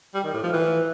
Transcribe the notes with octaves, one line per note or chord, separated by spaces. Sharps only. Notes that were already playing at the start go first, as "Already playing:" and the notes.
G3
D#3
A2
F3
E3